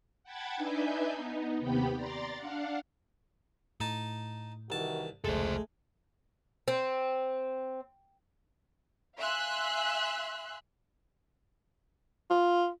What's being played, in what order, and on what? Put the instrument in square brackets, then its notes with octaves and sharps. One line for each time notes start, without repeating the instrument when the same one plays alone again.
[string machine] F#5 G5 A5 B5 G#6 A6
D4 D#4 B4 E5 G#5 G6
B3 D#4
D#2 C3 B3 G4 G5 B5
D5 A#5 C6 A6
D4 F5 F#5
[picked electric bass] A2 [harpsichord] D#4 A5
[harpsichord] C2 A5 [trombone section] D#3 E3 F#4
[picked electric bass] F1 C#2 [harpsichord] G#3 [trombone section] A3 [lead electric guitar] A4 C5
[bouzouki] C4
[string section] E5 F5 G#5 C6 E6 F#6
[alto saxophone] F4